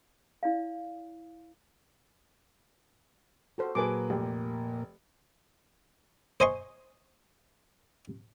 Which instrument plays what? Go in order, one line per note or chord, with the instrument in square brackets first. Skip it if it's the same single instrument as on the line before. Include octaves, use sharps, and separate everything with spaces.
[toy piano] E4 D5 F5
[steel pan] F#4 A4 C5
[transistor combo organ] A#2 A#3 [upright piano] F#3 G#4 B4 [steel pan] G#5 A5 D6
[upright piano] F1 [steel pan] G4
[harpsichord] C5 D#5 G#5 C6 C#6